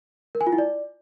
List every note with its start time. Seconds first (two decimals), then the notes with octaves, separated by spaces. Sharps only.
0.35 A#4
0.41 G#5
0.47 F4
0.52 E4
0.58 D5